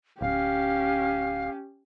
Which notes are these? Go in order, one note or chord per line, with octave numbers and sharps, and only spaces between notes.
D1 C#4 G4 F5